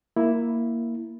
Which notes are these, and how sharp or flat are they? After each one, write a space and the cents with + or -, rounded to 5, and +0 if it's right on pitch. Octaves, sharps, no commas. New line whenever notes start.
A#3 +0 E4 +0